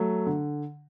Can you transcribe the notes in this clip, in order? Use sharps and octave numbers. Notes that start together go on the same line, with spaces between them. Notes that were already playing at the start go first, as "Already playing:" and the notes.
Already playing: F#3 A3
D3